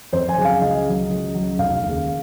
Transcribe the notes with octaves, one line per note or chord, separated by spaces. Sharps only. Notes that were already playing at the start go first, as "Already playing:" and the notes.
F2 C5
G#5
C#3 F#3
F5
C#2 D#5
C#3 F#3
C#2
C#3 F#3
F1 F5
D#2 C#3